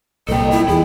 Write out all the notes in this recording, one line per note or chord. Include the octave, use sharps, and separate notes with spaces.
C2 A#2 A4 D#5 G5
E4
E2 E4 G#4